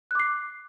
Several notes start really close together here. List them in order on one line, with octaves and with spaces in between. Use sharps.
F#6 D6 C7